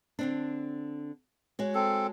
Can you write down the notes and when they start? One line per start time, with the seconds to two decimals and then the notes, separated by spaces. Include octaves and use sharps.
0.19 D3 C4 D4
1.59 G#3 F#4 C#5
1.75 C4 A4